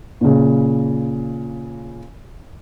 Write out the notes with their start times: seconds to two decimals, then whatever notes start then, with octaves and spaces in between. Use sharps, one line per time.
0.21 A#2 C#3